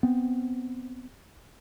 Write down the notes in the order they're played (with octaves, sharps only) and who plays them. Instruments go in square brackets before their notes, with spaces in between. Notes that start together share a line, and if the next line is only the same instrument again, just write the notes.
[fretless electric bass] B3 C4